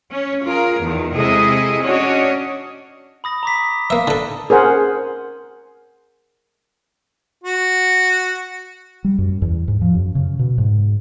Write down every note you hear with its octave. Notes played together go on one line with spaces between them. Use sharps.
C#4
F4 G#4 A#4
E2 D#3
C3 G#3 E4 G#4 A4 D#5
C#4 D4 F#4 C#5 D#5
B5 D#6 A#6
A#5 D6 B6
D#6
A#3 E5
D3 A4 A5
G#4 A#4 C5 F#5
F#4
G3
F#2
E2
G#2
F3
F#2
C#3
B2
G#2